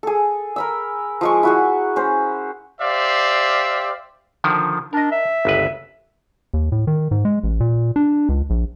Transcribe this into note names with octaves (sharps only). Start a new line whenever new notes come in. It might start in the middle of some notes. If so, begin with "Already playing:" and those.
G#4 A4
A#4 B5 E6
F3 G#3 C#6
E4 F#4 G#4
C#4 C5
G4 C5 D5 E5 F5
D3 D#3 F3
D4 A#4 D#5
E5
G1 C#2 B4
D#2
A2
D#3
G#2
G#3
A1
A#2
D4
C#2
A#1